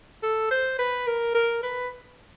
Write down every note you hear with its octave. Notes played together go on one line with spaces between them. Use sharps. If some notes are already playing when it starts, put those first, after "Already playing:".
A4
C5
B4
A#4
A#4
B4